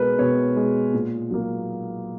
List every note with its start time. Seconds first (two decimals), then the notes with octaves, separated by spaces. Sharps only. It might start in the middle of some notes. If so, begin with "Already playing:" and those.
Already playing: B2 G#3 A#4 B4
0.18 B2 C#5
0.56 G#3
0.93 A#2
1.31 F#3 A#3